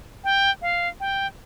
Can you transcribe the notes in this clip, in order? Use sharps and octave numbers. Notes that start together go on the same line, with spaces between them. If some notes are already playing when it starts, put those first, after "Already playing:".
G5
F5
G5